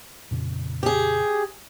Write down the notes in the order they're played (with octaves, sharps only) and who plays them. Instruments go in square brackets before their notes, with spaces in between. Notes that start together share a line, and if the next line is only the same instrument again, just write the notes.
[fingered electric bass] F2 A#2 C#3
[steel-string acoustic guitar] G4 G#4